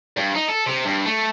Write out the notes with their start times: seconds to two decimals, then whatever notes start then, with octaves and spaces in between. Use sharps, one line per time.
0.17 G2
0.35 D#4
0.49 A4
0.66 C3
0.85 G2
1.06 A3